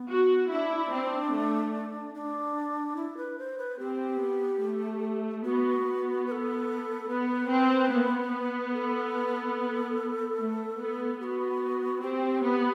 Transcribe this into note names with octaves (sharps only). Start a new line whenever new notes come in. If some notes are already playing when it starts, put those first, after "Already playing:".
Already playing: B3
F#4
D4 E4
C4
A3
D4
E4
B4
C5
B4
C4 G4
B3
A3
B3 F#4
B3
B4
A4
B3 B4
C4
B3
A4
A3
B3
B3 F#4 G4
C4 G4
B3